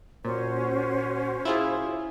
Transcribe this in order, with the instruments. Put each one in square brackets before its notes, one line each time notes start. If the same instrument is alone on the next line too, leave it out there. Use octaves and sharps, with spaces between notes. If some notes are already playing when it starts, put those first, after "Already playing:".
[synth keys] A#2 [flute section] C#4 F#4 C5
[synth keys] E4 F4 G#4